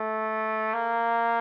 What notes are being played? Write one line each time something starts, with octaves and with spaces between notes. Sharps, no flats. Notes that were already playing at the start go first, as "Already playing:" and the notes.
Already playing: A3
A#3